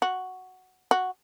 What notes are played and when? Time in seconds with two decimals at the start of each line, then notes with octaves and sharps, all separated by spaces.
0.02 F#4
0.91 F#4